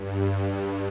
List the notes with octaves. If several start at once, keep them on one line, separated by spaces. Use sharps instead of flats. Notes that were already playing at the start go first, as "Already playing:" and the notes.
Already playing: G2